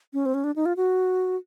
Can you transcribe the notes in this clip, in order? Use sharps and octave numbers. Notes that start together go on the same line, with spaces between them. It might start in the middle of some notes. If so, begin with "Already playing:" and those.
C#4
C4
C#4
D4
D#4
F4
F#4